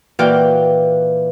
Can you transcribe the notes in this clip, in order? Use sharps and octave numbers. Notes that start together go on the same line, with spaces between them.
A#2 E3 F#4 D5 G5 F6